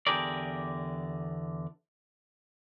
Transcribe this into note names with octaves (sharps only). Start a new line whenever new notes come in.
E2 D3 G4 G#4 A#4 D5